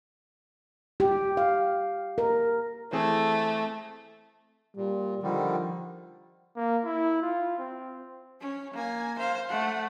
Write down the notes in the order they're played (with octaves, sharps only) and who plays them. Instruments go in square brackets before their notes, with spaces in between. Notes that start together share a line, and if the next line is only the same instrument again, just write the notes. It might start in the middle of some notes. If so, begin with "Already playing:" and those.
[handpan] G4
F5
A#4
[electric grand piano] E3 C4 G#4 [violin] A3
[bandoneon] A#2 [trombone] G3
[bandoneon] D3 D#3 G3 [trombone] F3
[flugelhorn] A#3
E4
F4
C4
[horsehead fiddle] C#4
A#3 G#5
C5 F5
A3 F#5